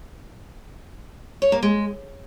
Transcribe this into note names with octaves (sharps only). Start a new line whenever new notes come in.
C#5
A#3
G#3